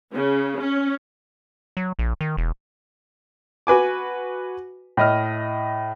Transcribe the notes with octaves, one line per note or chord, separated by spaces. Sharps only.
C#3
C#4
F#3
A#1
D#3
E1
F#4 B4 G#5 D6
A2 D#5 F6